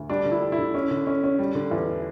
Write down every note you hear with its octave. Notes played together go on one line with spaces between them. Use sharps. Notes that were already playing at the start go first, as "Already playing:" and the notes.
Already playing: D2
G3 D4
D3
E4
G3
E4
D3
C#4
D3
C#4
C#4
G3
D3
E2